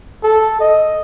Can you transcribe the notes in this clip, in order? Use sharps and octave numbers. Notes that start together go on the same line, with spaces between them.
A4
D#5